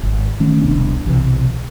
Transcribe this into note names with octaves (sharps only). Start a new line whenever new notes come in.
G#1
D#3 A3 C#4
E1 C2 B3 D4
B1 C3 E3